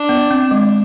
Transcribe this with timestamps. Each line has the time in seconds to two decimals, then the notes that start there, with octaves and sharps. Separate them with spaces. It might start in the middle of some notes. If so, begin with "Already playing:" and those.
Already playing: D4
0.09 B3
0.31 C4
0.51 G#3